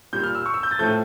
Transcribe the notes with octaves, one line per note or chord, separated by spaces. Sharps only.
A#2 G3 G6
F6
E6
C#6
E6
G6
A6
A2 F3 A3 G6